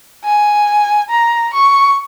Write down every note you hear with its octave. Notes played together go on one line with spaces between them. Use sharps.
G#5
A#5
C#6